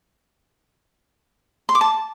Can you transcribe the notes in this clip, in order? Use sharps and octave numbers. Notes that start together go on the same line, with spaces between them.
C6
D6
A5